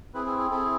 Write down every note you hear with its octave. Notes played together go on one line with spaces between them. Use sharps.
C4 E4 G#4 B4
G#4
G#4
C4 E4 G#4 A4